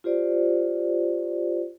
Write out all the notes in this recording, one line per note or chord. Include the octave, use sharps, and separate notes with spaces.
F4 G4 C5 D5